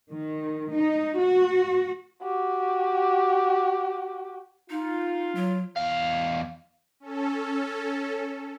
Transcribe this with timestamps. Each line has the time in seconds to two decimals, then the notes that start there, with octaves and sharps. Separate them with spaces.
0.11 D#3
0.74 D#4
1.20 F#4
2.23 F#4 G4
4.70 D#4 F4
5.35 F#3
5.76 E2 F5
7.00 C#4 A4